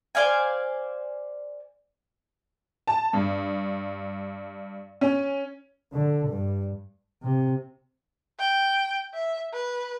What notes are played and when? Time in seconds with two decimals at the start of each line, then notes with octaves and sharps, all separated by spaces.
0.15 C5 D5 F5 G#5
2.87 A5
3.13 G2
5.01 C#4
5.93 D3
6.29 G2
7.23 C3
8.39 G5
9.14 E5
9.53 B4